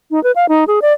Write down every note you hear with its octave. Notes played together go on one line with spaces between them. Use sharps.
D#4
B4
F5
D#4
G#4
D5